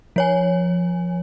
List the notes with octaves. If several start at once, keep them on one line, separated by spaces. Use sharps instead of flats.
F3 C#5 G#5